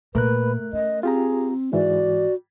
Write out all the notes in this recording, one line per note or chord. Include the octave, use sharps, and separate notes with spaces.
A#2 A3 A#4 B4 F#6
C#4 D#5
C4 F4 G4 G#4 A#5
G#2 E3 F#4 D5